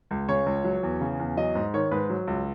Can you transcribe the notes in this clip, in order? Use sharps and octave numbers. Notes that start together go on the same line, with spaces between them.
C#2
C#3 C#5
C#2
F#3
E2
C#3
E2
F#3 D#5
G#2
D#3 C#5
G#2 B4
F#3
C#2